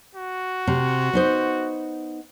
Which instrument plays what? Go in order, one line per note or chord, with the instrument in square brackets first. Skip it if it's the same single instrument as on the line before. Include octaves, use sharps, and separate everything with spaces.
[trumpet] F#4
[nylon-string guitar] C3
B3 D#4 C5